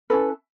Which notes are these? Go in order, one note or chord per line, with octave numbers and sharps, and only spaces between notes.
C#4 E4 A4 B4